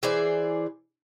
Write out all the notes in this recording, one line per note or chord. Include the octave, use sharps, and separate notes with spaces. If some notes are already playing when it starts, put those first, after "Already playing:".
E3 G#4 C5 D5